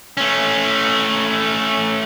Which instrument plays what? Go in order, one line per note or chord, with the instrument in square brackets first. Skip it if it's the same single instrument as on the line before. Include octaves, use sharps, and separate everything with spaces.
[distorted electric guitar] A3 C#4